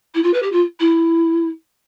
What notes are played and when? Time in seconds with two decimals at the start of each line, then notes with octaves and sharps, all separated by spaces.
0.14 E4
0.23 F4
0.33 B4
0.42 G4
0.51 F4
0.79 E4